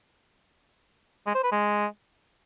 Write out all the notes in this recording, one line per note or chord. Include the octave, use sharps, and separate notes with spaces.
G#3
C5
B4
G#3